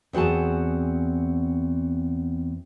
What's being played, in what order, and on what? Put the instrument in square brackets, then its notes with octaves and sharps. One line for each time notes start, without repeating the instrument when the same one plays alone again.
[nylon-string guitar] E2 C4 F#4 G#4 A5